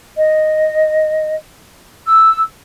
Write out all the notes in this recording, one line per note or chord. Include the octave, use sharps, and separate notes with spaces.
D#5
E6